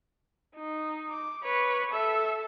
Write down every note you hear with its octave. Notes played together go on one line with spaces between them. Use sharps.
D#4
D6
B4 C#5
A4 E5